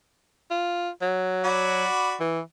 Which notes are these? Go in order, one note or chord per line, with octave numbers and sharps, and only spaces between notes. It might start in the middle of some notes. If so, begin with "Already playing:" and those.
F4
F#3
F#4 D5 B5
E3